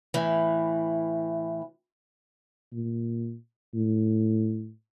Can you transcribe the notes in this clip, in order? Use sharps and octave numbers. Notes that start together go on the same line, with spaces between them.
A2 E3
A#2
A2